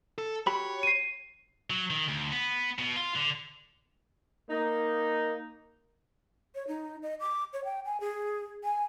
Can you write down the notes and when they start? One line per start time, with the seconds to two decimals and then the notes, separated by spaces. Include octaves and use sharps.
0.18 A4
0.47 F#4 G4 C#5 B5
0.83 C7 D#7
1.70 F#3
1.90 D#3
2.09 D2
2.32 B3
2.79 B2
2.96 F4
3.15 D3
4.50 A#3 D#4
6.55 C#5
6.67 D#4
7.03 D#5
7.20 D6
7.53 C#5
7.64 G5
7.85 G#5
8.00 G#4
8.64 G#5